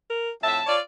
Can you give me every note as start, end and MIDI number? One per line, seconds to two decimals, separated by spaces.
0.10 0.30 70
0.43 0.60 41
0.43 0.60 45
0.43 0.60 76
0.43 0.72 81
0.67 0.79 65
0.67 0.79 73
0.67 0.79 74